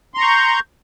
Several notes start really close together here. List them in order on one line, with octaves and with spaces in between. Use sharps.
C6 A#5 C#6 G6